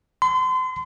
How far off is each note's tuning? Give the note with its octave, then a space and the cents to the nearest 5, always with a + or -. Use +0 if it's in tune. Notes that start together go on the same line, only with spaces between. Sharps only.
C6 -35